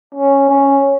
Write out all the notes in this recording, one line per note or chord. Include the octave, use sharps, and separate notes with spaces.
C#4
C#4